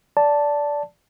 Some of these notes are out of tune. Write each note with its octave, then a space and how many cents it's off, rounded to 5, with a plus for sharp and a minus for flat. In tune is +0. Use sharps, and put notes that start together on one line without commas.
D5 -15 A5 +0